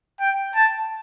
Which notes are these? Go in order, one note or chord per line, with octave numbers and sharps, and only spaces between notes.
G5
A5